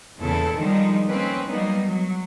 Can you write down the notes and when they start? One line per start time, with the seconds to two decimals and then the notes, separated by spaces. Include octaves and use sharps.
0.21 E2 A#2 C#3 E4 A4
0.57 D3 D#3 F3 G3 G#3 D#4
1.08 A#3 C4 C#4 D#4 B4
1.48 F#3 G3 A#3 B3 D#4
1.86 F#3